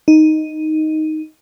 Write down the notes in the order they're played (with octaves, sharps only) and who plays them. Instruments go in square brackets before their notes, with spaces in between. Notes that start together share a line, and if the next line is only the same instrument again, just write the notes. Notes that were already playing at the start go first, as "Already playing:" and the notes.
[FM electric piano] D#4